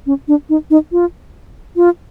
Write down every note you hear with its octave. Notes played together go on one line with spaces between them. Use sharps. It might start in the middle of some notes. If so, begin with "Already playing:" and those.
C#4
D4
D#4
D#4
F4
F4